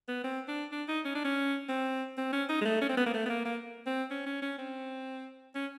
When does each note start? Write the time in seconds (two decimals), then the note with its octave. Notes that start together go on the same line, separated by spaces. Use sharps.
0.08 B3
0.24 C4
0.48 D4
0.72 D4
0.88 D#4
1.05 C#4
1.15 D4
1.25 C#4
1.69 C4
2.17 C4
2.33 C#4
2.49 D#4
2.61 G#3
2.65 A3
2.81 C#4
2.89 C4
2.97 B3
3.06 A#3
3.14 A3
3.26 B3
3.30 A#3
3.45 A#3
3.86 C4
4.10 C#4
4.26 C#4
4.42 C#4
4.58 C4
5.55 C#4